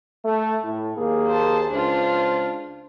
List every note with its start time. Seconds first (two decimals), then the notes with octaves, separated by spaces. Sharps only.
0.25 A3
0.63 A2
0.97 D#2 A#3 G#4
1.28 C5 A5
1.71 C#2 D4 F4 C5